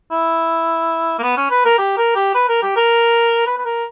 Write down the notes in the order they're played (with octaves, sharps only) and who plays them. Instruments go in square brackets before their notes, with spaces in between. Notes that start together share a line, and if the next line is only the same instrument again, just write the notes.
[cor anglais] E4
A#3
B3
C#4
B4
A#4
G4
A#4
G4
B4
A#4
G4
A#4
B4
B4
A#4